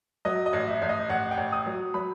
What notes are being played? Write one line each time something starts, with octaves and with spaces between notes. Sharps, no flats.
F#3 D#5
D#5
A1
E5
A1
D#5
A1 F#5
G5
A1
D#6
F#3
F#3 B5